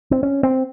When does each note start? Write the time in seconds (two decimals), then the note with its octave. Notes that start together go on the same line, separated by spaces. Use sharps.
0.11 C4
0.23 C#4
0.43 C4